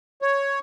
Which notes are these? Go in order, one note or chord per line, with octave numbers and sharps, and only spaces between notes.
C#5